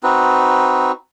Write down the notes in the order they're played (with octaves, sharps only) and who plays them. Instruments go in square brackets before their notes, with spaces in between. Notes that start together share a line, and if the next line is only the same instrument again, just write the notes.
[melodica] C4 D#4 F#4 B4